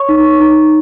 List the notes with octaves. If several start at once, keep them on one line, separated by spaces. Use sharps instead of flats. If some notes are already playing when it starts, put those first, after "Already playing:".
Already playing: C#5 C#6
D#4
D#4